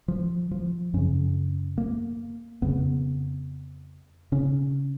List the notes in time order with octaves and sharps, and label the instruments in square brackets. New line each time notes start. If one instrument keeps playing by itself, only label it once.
[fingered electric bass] F3
F3
F#2 C#3 C#4
A#3
F2 C#3 B3
C#3 C#4